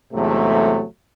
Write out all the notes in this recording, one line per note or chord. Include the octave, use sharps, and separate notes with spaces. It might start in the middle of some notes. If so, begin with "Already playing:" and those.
E2 G#2 C3 F#3 A3